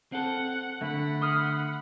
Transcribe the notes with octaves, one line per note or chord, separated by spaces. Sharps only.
C4 A4 F#5
D3 A3 F#5 B5
C6 D#6 F6